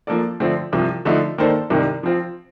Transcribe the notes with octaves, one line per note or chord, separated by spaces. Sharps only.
F3 A#3 D4 A4 D5
D3 F3 A3 C4
C2 C3 F3
D3 F3 A3 D#4
D#3 A#3 D4 A4 C5
C2 C3 D#3 G3
F3 C4 F4